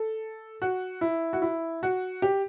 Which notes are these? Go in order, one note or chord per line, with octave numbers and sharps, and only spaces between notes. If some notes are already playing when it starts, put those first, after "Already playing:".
Already playing: A4
F#4
E4
F#4
E4
F#4
G4